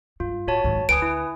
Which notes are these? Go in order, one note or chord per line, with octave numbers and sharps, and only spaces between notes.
G2 F4
A2 F#4 C#5 A5
G#2 D#3
D2 B4 G#5 D#6 D7
E4